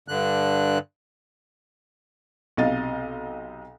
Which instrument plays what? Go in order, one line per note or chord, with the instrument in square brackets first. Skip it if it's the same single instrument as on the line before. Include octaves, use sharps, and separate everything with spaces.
[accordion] G2 D3 F#6
[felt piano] B1 C3 D#5 F5 A6